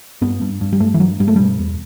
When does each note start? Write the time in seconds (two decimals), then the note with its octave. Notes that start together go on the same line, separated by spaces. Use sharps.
0.21 G2 B3
0.41 G2
0.61 G2
0.73 G3
0.80 G2 A3
0.94 E3
1.00 G2 F#3
1.20 G2 G3
1.28 A3
1.36 B2 G3
1.59 E2